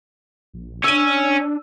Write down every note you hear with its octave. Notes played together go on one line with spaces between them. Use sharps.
A#1
C#4 D4 E6 D#7